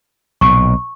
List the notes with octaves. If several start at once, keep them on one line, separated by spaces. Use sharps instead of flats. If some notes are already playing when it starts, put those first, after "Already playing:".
B1 A#2 C#6